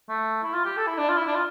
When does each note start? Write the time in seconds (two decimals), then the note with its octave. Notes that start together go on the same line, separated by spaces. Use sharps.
0.09 A3
0.43 E4
0.54 F4
0.65 G4
0.77 A4
0.87 E4
0.98 D4
1.09 F4
1.17 E4
1.27 D4
1.35 F4